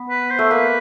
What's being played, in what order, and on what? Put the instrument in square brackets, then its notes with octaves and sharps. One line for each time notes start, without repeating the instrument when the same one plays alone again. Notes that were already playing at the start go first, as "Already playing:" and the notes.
Already playing: [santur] B3
[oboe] B4
C5
[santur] A3
[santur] A#3 [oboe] B4